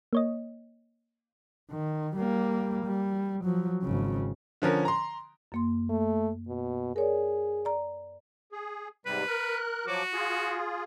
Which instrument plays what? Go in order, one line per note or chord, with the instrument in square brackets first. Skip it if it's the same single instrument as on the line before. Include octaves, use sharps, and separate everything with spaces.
[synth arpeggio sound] A#3 C#5 D#5
[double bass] D#3
G3 A#3
G3
F3 F#3
G#1 C#3
[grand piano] D3 F3 C#4 A#4
A#5 C6
[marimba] F#2 A#3 C6
[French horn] A3
B2
[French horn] G#4 [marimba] A#4 C#5 D5
[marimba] D5 A#5
[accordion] G#4
[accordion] G#2 C3 G3 [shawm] B4
[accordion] A#4 F#6
[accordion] F3 F#3 D6 [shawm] F#4
[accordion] F4 G#4